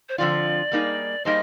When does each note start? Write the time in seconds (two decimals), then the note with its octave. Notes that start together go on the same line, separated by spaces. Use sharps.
0.09 C5
0.18 D3 F3 C4 F4 D5
0.71 G3 A#3 D#4 G#4
1.25 G3 A#3 D#4 G#4 C5 D#5